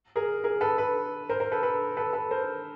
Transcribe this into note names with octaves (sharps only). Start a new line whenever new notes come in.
G#4 A#4
G#4 A#4
A4 B4
A4 B4
A#4 C5
A#4 C5
A4 B4
A4 B4
A4 B4
A4 B4
A#4 C5